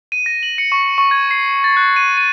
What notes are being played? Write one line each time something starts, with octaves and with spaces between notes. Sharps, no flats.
D#7
A#6
F#7
C#7
C#6
C#6
G#6
C7
A6
F#6
D#7
D#7